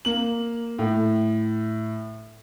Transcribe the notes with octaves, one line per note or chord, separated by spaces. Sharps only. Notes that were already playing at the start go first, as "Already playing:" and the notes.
A#3 F#7
A2